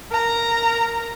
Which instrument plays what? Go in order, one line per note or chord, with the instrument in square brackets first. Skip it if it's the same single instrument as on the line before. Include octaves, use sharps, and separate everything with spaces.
[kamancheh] A#4 A#5